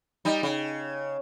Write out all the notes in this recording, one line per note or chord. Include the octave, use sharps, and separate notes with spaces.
G3 D#4
C#3